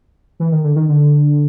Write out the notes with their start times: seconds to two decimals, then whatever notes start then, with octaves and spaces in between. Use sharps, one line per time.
0.40 E3
0.52 D#3
0.64 D3
0.76 D#3
0.89 D3